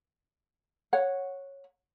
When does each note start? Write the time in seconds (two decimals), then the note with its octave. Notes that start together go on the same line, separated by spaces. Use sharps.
0.93 C#5 F#5